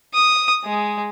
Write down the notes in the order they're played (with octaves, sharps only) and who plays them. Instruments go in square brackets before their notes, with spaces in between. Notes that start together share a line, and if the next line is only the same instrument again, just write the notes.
[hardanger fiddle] D#6
G#3